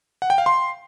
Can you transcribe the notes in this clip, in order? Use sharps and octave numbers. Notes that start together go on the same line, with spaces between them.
F#5
G5
F5
C6